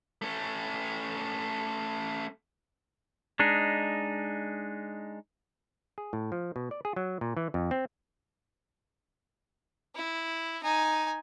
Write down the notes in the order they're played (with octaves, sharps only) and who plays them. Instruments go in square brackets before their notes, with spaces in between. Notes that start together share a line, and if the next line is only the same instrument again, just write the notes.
[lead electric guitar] A3 C#4
[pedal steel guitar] G#3 D4 D#4
[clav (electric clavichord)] G#4
A2
F3
B2
D5
G#4
F#3
A#2
E3
F2
C4
[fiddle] E4
D#4 G#5